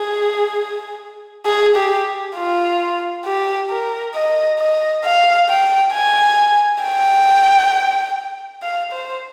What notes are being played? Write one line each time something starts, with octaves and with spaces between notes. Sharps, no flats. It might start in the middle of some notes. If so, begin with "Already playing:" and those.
Already playing: G#4
G#4
G4
F4
G4
A#4
D#5
D#5
F5
G5
G#5
G5
F5
C5